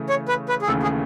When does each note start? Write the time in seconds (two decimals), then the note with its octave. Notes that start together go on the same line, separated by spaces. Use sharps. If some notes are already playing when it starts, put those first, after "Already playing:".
Already playing: C#3 E3 A3
0.09 C#5
0.28 B4
0.49 B4
0.62 G#4
0.67 D#2 C#3 E3 A3 C#4 A4
0.83 G#4